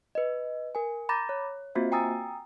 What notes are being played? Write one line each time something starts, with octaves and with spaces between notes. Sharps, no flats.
B4 D#5
A#4 G#5
A#5 B5 D6 G6 A6 A#6
C#5
A#3 C4 F4 F#4 C5 E5
G5 G#5 A#5 D#6 E6 A6